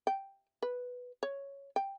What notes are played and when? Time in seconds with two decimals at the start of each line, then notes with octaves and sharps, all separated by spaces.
0.07 G5
0.63 B4
1.23 C#5
1.76 G5